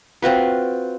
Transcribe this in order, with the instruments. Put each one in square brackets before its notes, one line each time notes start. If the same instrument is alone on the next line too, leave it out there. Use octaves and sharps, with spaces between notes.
[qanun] C4 F4 F#4 B4